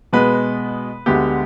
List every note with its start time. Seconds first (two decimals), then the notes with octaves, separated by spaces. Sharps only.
0.13 B2 G#3 B3 B4
1.06 D2 D3 G#3 B3 G4